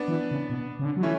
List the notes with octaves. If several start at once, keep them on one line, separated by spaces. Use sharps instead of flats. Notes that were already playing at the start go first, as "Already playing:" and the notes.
Already playing: B3 D4
E3
C#3
B2
C#3
D3
F#3
E3 A3 C#4